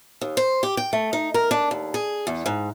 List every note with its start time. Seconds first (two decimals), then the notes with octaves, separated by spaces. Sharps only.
0.21 D#2
0.37 C5
0.63 G4
0.77 G5
0.93 A3
1.13 D#4
1.34 A#4
1.51 D4
1.71 D#2
1.94 G#4
2.27 E2
2.46 G#2